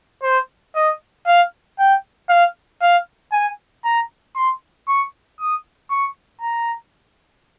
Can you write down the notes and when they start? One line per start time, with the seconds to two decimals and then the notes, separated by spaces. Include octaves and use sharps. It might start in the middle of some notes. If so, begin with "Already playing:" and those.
0.23 C5
0.75 D#5
1.26 F5
1.79 G5
2.29 F5
2.82 F5
3.32 G#5
3.85 A#5
4.36 C6
4.88 C#6
5.40 D#6
5.90 C#6
6.41 A#5